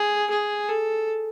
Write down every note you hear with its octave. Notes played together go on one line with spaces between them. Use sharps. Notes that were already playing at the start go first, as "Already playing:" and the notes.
Already playing: G#4
G#4
A4